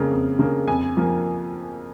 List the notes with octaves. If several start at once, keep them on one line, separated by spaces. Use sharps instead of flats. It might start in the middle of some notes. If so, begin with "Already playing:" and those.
Already playing: F2 C#3 A#3
F2
C#3 A#3
F2 G#5
F3 A#3